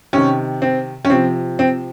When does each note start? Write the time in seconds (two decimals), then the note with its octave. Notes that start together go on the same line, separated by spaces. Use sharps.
0.13 C3 D#3 C#4
0.62 C4
1.05 C#4
1.10 C3 F3 C4
1.59 C4